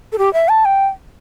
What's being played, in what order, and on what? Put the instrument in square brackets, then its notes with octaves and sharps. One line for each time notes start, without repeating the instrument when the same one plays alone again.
[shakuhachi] A4
G4
E5
A5
G5